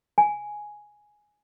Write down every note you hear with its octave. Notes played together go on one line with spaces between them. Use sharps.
G#5